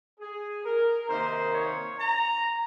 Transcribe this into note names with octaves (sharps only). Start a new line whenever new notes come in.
G#4
A#4
C3 D#3 A#3 D#4 C5
C#5
A#5